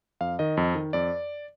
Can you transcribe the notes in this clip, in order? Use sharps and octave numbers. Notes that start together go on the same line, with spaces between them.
F2 F5
D#3 D#5
F2
D#3
F2 D5